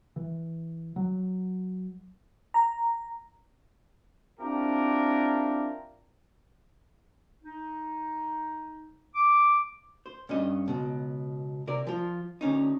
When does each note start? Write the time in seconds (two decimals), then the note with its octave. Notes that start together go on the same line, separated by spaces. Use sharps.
0.16 E3
0.96 F#3
2.54 A#5
4.40 C4 D4 E4 F4 G4 A#4
7.43 D#4
9.15 D6
10.06 C5
10.29 G2 C#4 D#5
10.68 C#2 B2
11.67 C3 A#4 D5
11.87 F3 F4
12.41 D2 C#4 D#4